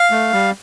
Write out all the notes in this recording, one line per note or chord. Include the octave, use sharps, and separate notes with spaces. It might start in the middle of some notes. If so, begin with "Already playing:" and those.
Already playing: F5
A3
G3